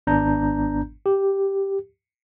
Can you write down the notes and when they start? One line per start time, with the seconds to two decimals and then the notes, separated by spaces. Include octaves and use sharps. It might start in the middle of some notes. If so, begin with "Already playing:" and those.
0.07 G#1 B3 D4 A#5 G6
1.06 G4